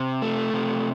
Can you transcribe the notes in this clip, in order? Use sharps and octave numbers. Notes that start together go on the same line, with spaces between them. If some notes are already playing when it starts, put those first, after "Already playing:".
Already playing: C3
A3
C3